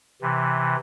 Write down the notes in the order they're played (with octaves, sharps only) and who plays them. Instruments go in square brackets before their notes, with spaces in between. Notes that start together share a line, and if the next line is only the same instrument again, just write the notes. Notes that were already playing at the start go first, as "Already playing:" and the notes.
[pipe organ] C3 E3